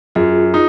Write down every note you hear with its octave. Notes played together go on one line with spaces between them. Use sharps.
F#2 F4 G#4
D#4